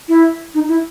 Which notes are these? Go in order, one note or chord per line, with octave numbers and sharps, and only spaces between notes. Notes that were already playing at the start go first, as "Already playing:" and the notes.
E4
D#4
E4